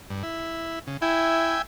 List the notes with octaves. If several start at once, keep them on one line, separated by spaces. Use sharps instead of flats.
G2
E4
C#3
E4 E5 G5 G#5